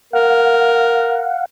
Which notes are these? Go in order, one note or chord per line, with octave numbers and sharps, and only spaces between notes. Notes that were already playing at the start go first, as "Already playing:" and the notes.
A#4 F5 F#5